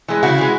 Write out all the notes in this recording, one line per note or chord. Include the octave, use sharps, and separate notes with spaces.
E3 G#3
C#3 E4 F#4
E3 G#3